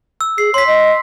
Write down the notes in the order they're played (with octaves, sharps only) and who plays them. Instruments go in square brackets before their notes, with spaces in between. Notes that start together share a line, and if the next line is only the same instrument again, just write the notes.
[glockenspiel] E6
[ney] G#4 [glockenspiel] C7
[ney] C#5 [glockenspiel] C6 B6
[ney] D#5